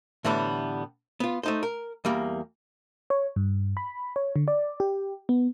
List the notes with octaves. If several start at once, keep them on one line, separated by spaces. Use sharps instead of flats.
A2 D3 E3 G3 B3
B3 F4
A3 D#4 C5
A#4
E2 G3 A#3
C#5
G2
B5
C#5
D3
D5
G4
B3